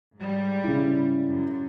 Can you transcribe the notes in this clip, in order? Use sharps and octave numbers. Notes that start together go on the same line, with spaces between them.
G#2 G3
C#3 E4
F#2